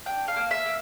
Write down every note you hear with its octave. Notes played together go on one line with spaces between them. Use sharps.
D4 G5
F5
A#3
E5
A#3